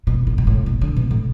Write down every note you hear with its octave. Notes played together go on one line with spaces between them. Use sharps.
B2
B2
B2
A2
B2
D3
B2
A2